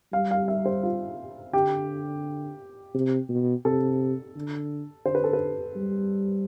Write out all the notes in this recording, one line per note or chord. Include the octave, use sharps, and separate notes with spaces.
G3 F5
F5
E5
C5
F4
D3 G4
C3
B2
C3 A4
D3
D3 C5
B4
A4
B4
G3